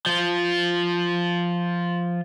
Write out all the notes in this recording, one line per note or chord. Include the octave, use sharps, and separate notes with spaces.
F3 F4